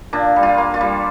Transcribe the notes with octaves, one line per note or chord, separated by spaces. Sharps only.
A#2 D4
G3
F4
A#3
F4
G3